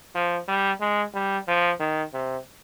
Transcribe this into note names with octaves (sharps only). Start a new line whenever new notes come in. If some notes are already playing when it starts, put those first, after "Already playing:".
F3
G3
G#3
G3
F3
D#3
C3